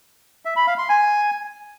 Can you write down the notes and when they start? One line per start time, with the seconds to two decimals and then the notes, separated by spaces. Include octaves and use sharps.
0.45 E5
0.56 B5
0.67 F5
0.78 C6
0.89 G#5